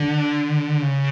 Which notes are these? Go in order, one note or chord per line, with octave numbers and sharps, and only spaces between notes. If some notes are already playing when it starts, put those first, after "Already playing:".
Already playing: D3
C#3